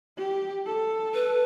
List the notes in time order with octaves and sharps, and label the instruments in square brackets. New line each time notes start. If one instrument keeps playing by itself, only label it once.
[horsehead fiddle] G4
A4
[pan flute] B4